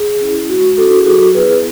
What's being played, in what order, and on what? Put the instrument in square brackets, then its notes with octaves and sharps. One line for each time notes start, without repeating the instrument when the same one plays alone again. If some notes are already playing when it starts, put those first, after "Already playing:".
Already playing: [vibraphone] G#4
C#4 E4
G#3 F#4
C#4 E4 F#4 A4
G#4
F#3 F#4 A4
B3 E4 G#4 B4